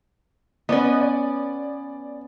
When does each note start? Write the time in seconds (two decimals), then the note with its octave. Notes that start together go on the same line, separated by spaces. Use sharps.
0.69 B3 C#4 B4 D5 D#5
1.01 D5